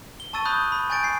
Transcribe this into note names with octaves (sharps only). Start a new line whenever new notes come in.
G7
A5 C#6 E6 A6 D#7
B5 D#6 F#6 G6
B5
G#5 C#6 G6 A6 D7
G#5 C7